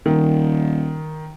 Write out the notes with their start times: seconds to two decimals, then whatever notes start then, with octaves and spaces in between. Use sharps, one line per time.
0.06 D#1 D#3